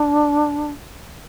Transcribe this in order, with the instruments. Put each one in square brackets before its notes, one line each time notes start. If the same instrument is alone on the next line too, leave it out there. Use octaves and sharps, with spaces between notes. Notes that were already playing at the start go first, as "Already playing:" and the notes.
Already playing: [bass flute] D4